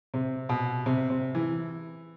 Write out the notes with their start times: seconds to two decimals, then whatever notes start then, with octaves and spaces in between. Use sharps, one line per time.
0.14 C3
0.49 B2
0.86 C3
1.10 C3
1.35 E3